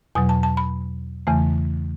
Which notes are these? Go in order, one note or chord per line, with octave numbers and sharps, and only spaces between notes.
E2 B2 F#3 G#5
A5
A5
B5
E2 C#3 E3 A3